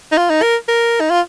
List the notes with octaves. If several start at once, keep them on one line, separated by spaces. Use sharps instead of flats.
D#4
F4
D#4
A#4
A#4
D#4
F4